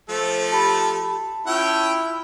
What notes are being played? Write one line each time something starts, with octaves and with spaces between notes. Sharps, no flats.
F3 A3 A4 C5
G4 A5 B5
C#4 E4 F4 G5